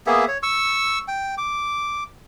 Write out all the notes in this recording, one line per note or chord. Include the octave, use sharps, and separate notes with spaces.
A#3 B3 G#4 E5
C#5
C#6 E6
G5
D6